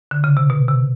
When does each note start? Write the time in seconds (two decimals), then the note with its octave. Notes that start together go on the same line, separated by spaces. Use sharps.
0.11 D3
0.24 C#3
0.37 C3
0.50 B2
0.69 C3